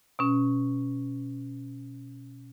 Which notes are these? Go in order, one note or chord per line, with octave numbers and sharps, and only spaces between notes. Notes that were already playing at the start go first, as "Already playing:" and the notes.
B2 C#4